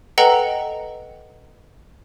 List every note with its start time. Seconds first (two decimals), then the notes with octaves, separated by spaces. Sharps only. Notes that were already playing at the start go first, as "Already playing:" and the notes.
0.18 A4 B4 D#5 F#5 G5 A#5